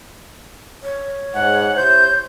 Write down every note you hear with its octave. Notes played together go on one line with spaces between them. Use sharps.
C#5
G#2 F#5
C3 E4 C5 G6